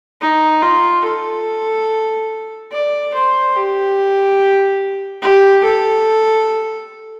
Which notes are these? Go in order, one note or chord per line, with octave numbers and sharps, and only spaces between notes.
D#4
F4
A4
D5
C5
G4
G4
A4